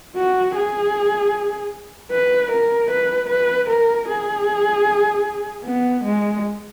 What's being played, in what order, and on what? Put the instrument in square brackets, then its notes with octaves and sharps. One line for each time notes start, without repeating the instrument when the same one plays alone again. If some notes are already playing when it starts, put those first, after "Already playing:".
[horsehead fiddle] F#4
G#4
B4
A#4
B4
B4
A#4
G#4
B3
G#3